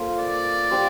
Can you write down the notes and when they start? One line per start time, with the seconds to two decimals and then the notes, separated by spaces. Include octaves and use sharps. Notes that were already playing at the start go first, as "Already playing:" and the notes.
Already playing: A#3 F4 A4 C5
0.19 D5
0.71 D4 G4 C5 F5